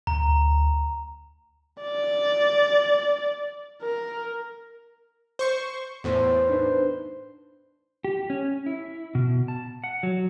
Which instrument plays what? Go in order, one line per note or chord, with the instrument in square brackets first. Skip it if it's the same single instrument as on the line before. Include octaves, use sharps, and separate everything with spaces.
[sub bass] D2 [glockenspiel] A#5
[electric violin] D5
A#4
[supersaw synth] C5 C#6
[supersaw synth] E2 A2 [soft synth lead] C5
[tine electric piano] D4 D#4 B4
[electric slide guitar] G4
C#4
E4
B2
A5
F#5
F#3